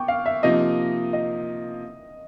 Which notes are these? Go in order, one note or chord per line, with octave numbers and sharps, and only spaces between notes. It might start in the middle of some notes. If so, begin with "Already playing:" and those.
Already playing: B3 G5 C#6 D6
F5
E5
C3 F3 A#3 D#4 D#5
D#5